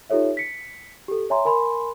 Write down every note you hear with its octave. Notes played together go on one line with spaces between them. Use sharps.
D#4 F4 G4 A4 C#5 E5
B6 C#7
G4 A4
C#5 E5 G#5 A#5 C6
A#4 G#5 B5 C6